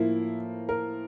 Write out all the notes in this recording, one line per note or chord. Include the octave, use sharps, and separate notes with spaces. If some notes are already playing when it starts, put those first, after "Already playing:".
Already playing: A2 F3 A#3 E4
A#4